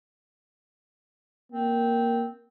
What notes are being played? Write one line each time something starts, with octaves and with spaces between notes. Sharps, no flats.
A#3 C4